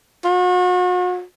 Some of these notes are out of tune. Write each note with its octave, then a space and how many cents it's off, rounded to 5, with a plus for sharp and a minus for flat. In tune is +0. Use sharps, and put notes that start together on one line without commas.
F#4 -40